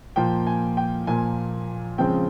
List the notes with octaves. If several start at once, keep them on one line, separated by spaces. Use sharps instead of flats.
A#2 F3 A#3 G5
G#5
G5
A#2 F3 A#3 G#5
C#3 F3 G#3 C4 G5